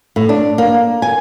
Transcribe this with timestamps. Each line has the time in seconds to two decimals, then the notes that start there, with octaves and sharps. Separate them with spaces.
0.16 A2
0.29 D4
0.58 A#3
1.02 G#5